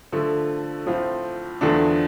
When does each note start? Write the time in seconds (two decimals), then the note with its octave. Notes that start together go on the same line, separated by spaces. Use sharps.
0.12 D3 F3 A3
0.87 A2 F3 C4 F4
1.61 E2 D3 F3 A3 D4